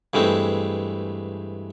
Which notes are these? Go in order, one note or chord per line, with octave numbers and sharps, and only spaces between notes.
G2 E3 G#3 A3 C4